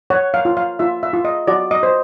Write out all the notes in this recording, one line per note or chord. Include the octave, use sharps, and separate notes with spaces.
C#5 F#5
F5
F4
F5
F4 E5
E5
F4
D#5
F#4 D5
D#5
C5